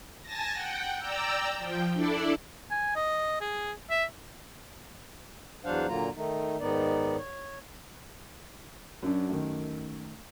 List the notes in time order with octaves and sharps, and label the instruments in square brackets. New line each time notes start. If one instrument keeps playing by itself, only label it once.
[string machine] G#5 A5 A6 A#6
F#5 G5
D5 G5 A#5 E6
F3 G5
D4 E4 A4 D5
[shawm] G#5
D#5
G#4
E5
[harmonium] E2 F#3 D4 C5 F5 F#5
A#2 D3 F#3 A#3 F4 A#5
D#3 A3 D#4
G#2 D#3 B3 D#4 D5
C#5
[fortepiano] F#2 [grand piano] F#3 D4
[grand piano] D#3 A3